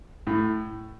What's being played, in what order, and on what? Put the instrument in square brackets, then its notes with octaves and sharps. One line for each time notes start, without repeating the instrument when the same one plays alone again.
[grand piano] A2